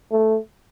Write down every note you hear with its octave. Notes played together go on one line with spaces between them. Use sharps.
A3